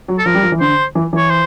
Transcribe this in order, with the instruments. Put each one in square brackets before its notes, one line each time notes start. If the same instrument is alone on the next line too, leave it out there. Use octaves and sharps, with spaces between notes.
[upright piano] F#3
[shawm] A4
[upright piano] F3 [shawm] A#4
[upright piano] G3
F3
E3
[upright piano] D3 [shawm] C5
[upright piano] E3
[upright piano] E3 [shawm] C#5
[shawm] C5